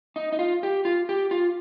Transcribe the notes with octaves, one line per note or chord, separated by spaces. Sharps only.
D#4
D#4
F4
G4
F4
G4
F4